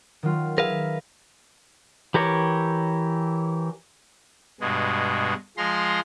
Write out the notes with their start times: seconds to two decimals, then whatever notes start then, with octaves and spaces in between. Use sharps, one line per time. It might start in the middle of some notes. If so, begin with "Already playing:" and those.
0.23 D#3 F#3 F4
0.58 G#4 A#4 B4 E5 F5 A#5
2.14 E3 G4 A#4 C#5
4.61 G2 B2 G#3
5.57 F3 G#3 A#5 C6